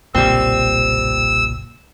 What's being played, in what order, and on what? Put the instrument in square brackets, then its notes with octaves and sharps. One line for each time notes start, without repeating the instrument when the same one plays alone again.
[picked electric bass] F#1 B1 A#2 [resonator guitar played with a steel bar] G3 C4 [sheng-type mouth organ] E6